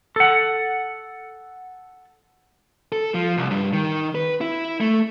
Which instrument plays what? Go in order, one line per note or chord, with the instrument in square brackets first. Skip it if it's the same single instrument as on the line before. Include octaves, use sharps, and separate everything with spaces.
[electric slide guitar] A4 F#5
[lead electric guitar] A4
F3
C2
G2
D#3
B4
E4
A3